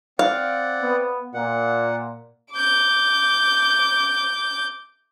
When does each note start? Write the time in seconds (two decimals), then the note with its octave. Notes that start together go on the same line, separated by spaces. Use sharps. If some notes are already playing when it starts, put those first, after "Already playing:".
0.19 C4 D5 F5 F#5
0.81 B3
1.34 A#2 F#5
2.53 D6 G6